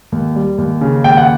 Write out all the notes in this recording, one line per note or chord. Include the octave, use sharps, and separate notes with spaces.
D#2
G3
D#2
C#3
D#2 G5
F#5